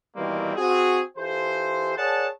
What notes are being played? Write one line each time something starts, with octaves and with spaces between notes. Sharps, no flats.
B2 D#3 E3 G3 A#3 C4
C4 F#4 G#4
E3 F4 G4 A4 C5
G#4 A#4 C#5 D5 F#5 A5